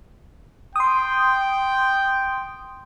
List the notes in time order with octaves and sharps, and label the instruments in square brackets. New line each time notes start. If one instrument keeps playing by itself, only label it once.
[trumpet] G5 [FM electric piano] C6 D#6